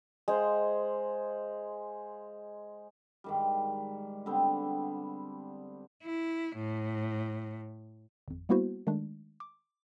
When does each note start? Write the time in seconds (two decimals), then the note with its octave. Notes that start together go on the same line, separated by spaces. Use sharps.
0.28 G#3 C5 F5
3.24 G#2 D#3 G3
4.26 D3 G3 B3 C4
6.03 E4
6.56 A2
8.28 G#1 F2
8.49 G3 A#3 B3 E4 F#4 C5
8.87 D#3 G#3 A3 D4
9.40 D6